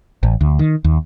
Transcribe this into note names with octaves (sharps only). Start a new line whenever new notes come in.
A1
D2
D#3
D#2